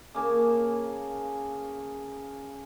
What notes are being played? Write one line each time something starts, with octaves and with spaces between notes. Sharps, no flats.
C#3 A#3 G#4 A5